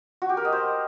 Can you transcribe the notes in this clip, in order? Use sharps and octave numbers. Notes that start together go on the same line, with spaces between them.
F#4
G4
A#4
D#5
C5